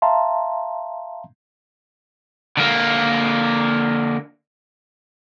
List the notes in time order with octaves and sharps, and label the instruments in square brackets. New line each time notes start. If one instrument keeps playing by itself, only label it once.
[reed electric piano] E5 F5 A5 A#5 C6
[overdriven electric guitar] D3 A#3